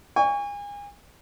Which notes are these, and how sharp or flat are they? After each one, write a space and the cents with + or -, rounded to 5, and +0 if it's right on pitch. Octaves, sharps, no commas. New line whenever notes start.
G#5 -35 C#6 +20